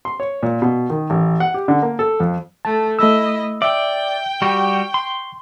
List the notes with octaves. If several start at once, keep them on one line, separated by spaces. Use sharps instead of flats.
C6
C#5
A#2
B2
D#3
A1
F#5
G4
D3
A#3
A4
F2
A3 A5
A3 E4 D#5 E6
D5 E5 G5
G3 F#4 G4 C#6
C6